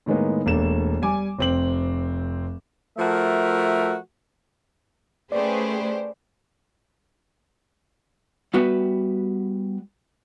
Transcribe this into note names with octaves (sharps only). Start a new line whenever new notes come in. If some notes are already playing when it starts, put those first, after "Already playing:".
A2 D#3 G#3 A#3 B3
E1 A3 A#3 D4 E7
G3 G#5 D6
F1 C4 F#7
F3 A3 F#4 A#4 E5
A3 C#4 G4 G#4 B4 C5 D5
G3 B3 F#4 G4 B4 E5